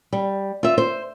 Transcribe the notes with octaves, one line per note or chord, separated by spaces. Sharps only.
G3
F4 E5
C5